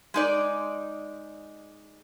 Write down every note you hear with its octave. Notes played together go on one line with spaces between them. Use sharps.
G#3 D#4 D5